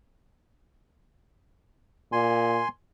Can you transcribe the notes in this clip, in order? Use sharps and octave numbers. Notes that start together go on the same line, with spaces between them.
A#2 G#5 C6